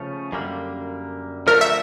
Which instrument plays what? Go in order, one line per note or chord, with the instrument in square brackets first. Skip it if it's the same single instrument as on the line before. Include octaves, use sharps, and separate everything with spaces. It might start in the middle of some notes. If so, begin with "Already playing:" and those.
Already playing: [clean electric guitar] C#3 F3 A3 C#4
F#2 D3 G3 A#3
[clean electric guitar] D3 F3 A3 [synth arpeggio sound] A#4
[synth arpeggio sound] E5